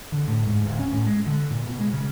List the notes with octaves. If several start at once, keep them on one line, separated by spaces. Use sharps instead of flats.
D3
A2
G#2
D1
C#4
A2
G#3
D3
A#2
B2
G#3
C#3